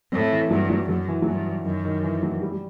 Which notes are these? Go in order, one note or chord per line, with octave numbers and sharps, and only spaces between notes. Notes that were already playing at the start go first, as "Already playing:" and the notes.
A2 C4
E3
G2 F#3
F#3
F#2 F#3
E3
F#3
G2 E3
F#2 D#3
D#3
E3
F#3
G3
G3